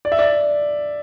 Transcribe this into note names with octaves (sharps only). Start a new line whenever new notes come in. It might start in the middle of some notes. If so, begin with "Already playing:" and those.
D5
E5
D5